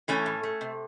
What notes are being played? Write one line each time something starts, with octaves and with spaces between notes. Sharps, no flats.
E3 A3 C#4
A2
A3
C3